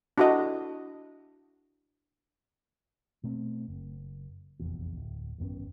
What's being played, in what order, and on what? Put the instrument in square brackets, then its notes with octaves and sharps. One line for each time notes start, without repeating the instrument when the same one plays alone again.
[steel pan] D4 E4 F#4 A4 D#5
[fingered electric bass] B2 A3 C4
F#1
F1 A#1 E2
D1
G#1 F#2 B3 C#4